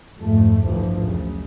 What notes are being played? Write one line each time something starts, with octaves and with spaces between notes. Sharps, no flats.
F2 G#2 A3
A1 D2 G2 E3 F3
F#2 C#3